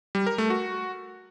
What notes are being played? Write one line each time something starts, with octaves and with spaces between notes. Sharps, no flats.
G3
A#4
A3
F#4